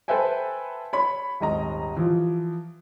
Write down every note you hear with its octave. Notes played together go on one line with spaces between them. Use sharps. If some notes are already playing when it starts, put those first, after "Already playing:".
A4 B4 C5 E5 G5 G#5
C#5 B5
D#1 G#1 D#5 A#5
E3 F3